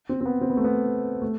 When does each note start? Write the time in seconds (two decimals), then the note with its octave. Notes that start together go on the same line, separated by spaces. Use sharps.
0.09 C4
0.21 C4
0.26 B3
0.41 C4
0.50 B3
0.57 A3
0.64 B3
1.22 A3